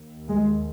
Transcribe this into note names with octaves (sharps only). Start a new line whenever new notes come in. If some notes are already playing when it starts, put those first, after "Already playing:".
Already playing: D#2
G#3